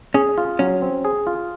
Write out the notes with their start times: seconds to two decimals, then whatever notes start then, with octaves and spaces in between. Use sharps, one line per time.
0.14 C#4 G#4
0.38 F4
0.59 F#3 C#4
0.82 C4
1.05 G#4
1.27 F4